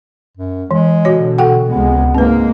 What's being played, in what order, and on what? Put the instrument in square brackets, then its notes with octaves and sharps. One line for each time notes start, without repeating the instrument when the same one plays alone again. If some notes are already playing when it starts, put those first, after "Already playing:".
[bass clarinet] F#2
[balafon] E3 [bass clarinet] G#3
[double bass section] B2 D3 [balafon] F#4 C#5
[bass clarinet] F#4 [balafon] A4 F#5 G5
[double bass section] C#2 C3 G#3 [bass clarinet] B3
[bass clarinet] G#2 [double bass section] G#3 A#3 [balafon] C4 B4